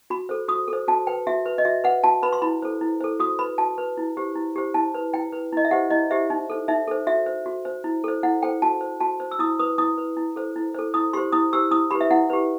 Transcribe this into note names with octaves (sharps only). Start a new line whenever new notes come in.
F#4 B5
A4 C5
F#4 D#6
A4 C5
F#4 A5
B4 G5
F#4 E5
B4
D#5
F#4 E5
B4 F#5
F#4 A5
B4 B5
C6
E4 B5
A4 C5
E4
A4 C5
F#4 D#6
B4 B5
F#4 A5
B4
E4
G4 C5
E4
G4 C5
E4 A5
B4
E4 G5
B4
E4 D#5
E5
G4 C5 F#5
E4 D#5
G4 C5 E5
D#4
A4 C5
D#4 E5
A4 C5
F#4 E5
C5
F#4
C5
E4
A4 C5
E4 F#5
A4 C5 G5
F#4 A5
C5
F#4 A5
C5
E6
E4 D#6
B4 D#6
E4 D#6
B4
E4
A4 C5
E4
A4 C5
E4 D#6
G4 C5 C6
E4 D#6
G4 C5 E6
E4 D#6
G4 B4 B5
E5
E4 F#5
G4 B4